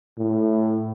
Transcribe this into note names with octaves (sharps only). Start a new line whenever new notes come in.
A2